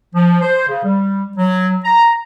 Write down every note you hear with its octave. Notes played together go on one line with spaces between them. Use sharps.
F3
C5
C#3
G3
F#3
A#5